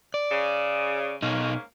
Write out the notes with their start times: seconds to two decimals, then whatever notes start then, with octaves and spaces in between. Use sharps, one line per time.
0.14 D5
0.30 C#3
1.22 G#2 B2 A#3 C#4 D#4